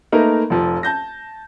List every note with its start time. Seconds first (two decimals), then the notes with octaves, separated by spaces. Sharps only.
0.12 A3 A#3 D#4 A#4 B4
0.50 F1 F3
0.83 A5 G6 A#6